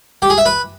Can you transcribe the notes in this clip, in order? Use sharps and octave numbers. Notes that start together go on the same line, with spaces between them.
G4
G#4
E5
B4